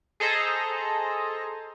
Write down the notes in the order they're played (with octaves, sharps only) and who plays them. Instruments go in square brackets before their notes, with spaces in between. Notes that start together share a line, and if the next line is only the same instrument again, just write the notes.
[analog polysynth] G#4 A4 C5 D#5 A#5